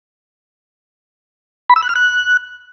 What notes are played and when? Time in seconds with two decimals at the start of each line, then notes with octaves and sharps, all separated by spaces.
1.70 B5
1.76 E6
1.83 F#6
1.89 F6
1.96 F#6